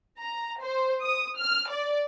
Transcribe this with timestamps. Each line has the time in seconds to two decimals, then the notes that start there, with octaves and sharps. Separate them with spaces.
0.20 A#5
0.61 C5
1.03 D#6
1.38 F6
1.70 D5